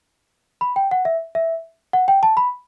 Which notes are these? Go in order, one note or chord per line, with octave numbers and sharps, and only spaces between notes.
B5
G5
F#5
E5
E5
F#5
G5
A5
B5